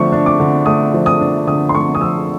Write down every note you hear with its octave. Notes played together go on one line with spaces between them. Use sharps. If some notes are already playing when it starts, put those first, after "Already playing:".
Already playing: D3 F3 A3 D4 C#6
D4
D6
D3
A3 D#6
F3
D#6
D4
D3 D#6
C6
A3 C#6
D#6
F3 E6